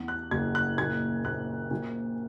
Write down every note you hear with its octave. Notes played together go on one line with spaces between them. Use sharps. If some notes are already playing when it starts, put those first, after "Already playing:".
Already playing: E2
F#6
F#1 G#6
F#6
A#2 G#6
A#1 F#6
A#2